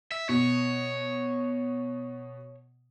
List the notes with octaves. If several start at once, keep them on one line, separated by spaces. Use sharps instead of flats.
E5
B2 C#5